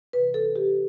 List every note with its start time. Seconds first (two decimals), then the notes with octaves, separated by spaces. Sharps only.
0.13 C3 E3 B4
0.34 A4
0.56 G4